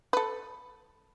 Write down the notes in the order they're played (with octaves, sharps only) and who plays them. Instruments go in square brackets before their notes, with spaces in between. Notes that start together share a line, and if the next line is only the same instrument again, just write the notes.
[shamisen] A4 B4